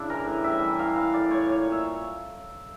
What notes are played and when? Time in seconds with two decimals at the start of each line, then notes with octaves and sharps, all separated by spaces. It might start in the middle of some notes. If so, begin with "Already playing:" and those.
Already playing: C#3 D4 E4
0.10 E3 A#4
0.26 A2
0.44 G3 E5
0.61 E3
0.79 E3 F5
0.96 E3 F5
1.14 A2 D5
1.31 A2 C#5
1.48 A#2 C#5
1.66 A#2
1.72 E5